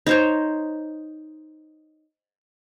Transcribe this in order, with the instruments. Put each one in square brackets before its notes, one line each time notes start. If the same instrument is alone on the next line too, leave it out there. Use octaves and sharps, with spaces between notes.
[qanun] D#4 C5 C#5